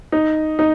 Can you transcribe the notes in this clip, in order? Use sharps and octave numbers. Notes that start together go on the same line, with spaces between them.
D#4
D#4